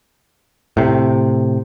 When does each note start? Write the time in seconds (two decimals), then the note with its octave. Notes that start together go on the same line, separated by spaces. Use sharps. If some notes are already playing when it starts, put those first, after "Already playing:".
0.77 A2 C3